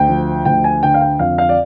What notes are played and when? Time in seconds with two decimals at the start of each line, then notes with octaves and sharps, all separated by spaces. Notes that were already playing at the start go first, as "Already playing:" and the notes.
Already playing: D2 G5
0.09 F3
0.45 D2 G5
0.64 G#5
0.83 D3 G5
0.94 F5
1.01 G5
1.19 F2 F5
1.38 F5
1.49 D5